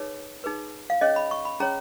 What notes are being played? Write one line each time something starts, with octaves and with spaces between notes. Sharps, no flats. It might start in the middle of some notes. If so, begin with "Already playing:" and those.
Already playing: D#4 G#4 B4 C#5
D#4 G#4 B4
F5
C#4 G#4 C#5 D#5
B5
C#6
B5
C#4 G#4 C#5 A#5